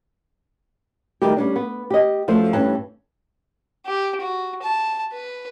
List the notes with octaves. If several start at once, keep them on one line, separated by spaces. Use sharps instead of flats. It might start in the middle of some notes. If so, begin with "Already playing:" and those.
D#3 G3 A3 G4
G3 C#4 D4
B3
G4 D#5
F#2 F3 A3 C5
G2 E3 C4 C#4 A5
G4
F#4
A5
B4